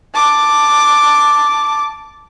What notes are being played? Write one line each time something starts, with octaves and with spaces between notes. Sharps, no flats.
A5 D6